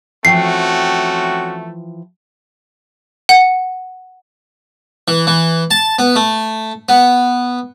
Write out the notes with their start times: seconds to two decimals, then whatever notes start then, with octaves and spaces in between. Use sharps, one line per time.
0.25 E3 F3 A3 C4 C#4 F#4 G5 C7
3.29 F#5
5.08 E3
5.27 E3
5.71 A5
5.99 B3
6.16 A3
6.89 B3